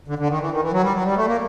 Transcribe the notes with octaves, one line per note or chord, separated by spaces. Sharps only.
D3
D3
D#3
E3
D#3
E3
F#3
G3
F#3
G3
A3
A#3